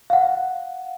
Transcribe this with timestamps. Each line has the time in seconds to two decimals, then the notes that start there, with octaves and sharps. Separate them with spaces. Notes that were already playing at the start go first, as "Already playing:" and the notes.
0.10 F5 F#5